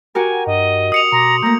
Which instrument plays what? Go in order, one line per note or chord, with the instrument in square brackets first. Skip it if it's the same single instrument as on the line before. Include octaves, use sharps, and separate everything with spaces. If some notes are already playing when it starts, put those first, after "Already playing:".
[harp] F#4 G4 A#4 [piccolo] G#5
[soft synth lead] G2 [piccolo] D#5
[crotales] D#6 C#7 F7 [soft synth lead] C7
[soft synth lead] B2 [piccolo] A#5 [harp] C6 D6
[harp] A3 A#3 [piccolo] A#5 [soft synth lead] G6